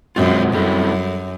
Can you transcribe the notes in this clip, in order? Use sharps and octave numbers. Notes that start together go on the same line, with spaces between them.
F#2 B2 G#3 C4 F4
F#2 G3 C4 E4 A4